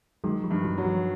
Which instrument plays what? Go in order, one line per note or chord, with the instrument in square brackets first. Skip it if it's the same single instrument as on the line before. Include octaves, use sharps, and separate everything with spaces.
[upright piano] D#3 [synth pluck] F#3 G#3
[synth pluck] F3 G3
[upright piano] G2
[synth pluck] E3 F#3
[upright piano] F#3
[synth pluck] F3 G3